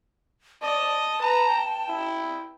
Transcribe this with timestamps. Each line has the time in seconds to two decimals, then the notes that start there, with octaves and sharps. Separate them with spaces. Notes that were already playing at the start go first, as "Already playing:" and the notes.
0.62 D5 D#5 A5
1.21 B4 A#5
1.50 G5
1.89 E4